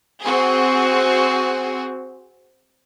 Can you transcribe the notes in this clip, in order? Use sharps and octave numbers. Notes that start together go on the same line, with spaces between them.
C4 F#4 G#4